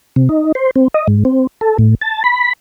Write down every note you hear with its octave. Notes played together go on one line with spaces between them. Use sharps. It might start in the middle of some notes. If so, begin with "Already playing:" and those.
C3
D#4
C5
C4
D#5
G#2
C4
A4
A2
A5
B5